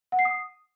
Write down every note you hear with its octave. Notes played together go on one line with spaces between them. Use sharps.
F#5
C7
D#6